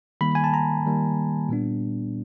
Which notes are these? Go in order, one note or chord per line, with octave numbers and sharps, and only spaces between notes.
D#3 G3 A#3 B5
G#5
A5
A#5
D#3 G3 A#3
A#2 G3 B3 D4